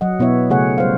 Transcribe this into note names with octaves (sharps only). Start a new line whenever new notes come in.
F#3 D#5 F#5
B2 B3 E4 C#5 E5
C#3 A3 G#4 C#5 F#5
G3 C5 F5